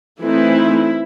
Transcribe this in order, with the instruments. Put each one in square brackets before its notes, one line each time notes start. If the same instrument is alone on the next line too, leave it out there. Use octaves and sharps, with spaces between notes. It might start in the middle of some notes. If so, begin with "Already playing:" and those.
[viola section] E3 A3 C4 D#4 E4